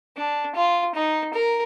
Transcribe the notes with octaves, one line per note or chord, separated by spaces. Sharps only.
D4
F4
D#4
A#4